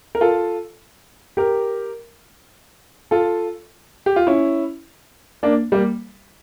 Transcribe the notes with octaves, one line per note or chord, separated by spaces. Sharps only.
A#4
F4 A4
G4 A#4
F4 A4
G4
F4
C#4 E4
A#3 D4
G3 A#3